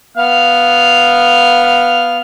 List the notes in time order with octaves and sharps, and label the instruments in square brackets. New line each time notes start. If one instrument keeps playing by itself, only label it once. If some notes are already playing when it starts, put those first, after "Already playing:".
[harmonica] B3 F5 F6